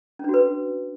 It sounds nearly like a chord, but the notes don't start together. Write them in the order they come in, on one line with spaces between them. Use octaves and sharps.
C#4 D4 F#4 B4